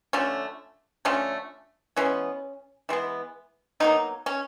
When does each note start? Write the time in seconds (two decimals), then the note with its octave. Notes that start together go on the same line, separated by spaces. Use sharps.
0.13 D3 F3 A3 C#4
1.05 D3 F3 A3 C#4
1.96 E3 G#3 B3 C#4
2.89 E3 G#3 B3
3.80 B2 F#3 A#3 D#4
4.26 C#4